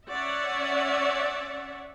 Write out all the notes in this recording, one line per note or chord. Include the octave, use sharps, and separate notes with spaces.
C#4 C#5 D5 E5 F#5